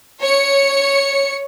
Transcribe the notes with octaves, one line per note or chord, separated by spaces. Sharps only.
C#5 C#7